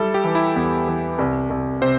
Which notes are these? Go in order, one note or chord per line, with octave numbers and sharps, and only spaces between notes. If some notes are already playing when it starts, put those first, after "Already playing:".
Already playing: G3 E4 A4
G4
E3
E4
E2
E3
C2
C2
C3 C5